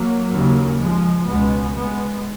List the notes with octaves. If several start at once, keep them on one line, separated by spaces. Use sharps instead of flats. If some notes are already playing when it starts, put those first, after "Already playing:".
Already playing: F#3 A#3
D#2 C#3
F3 G#3
C#2 B2 G#3 B3
G#3 B3